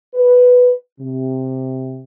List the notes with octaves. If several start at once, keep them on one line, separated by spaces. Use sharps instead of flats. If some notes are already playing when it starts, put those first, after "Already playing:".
B4
C3